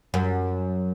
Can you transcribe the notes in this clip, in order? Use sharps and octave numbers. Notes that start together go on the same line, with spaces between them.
F#2